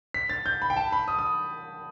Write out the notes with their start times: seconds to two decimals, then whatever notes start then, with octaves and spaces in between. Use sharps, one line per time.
0.14 B6
0.29 A6
0.46 G6
0.62 B5
0.70 G5
0.76 A5
0.92 B5
1.08 D#6
1.19 D#6